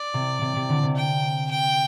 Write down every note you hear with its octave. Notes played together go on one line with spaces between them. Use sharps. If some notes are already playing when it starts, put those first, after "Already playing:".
Already playing: D5
C3
C3
C3
D3
C3
G5
G5